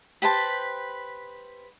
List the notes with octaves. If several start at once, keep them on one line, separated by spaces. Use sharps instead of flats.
G4 B4 C5 A5